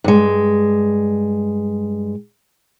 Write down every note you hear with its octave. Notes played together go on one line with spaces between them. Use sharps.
G2 G#3